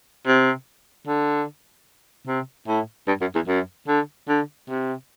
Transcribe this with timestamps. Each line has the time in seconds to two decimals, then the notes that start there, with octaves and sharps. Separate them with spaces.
0.27 C3
1.07 D3
2.27 C3
2.68 A2
3.07 G2
3.21 F#2
3.35 E2
3.48 F#2
3.88 D3
4.28 D3
4.69 C3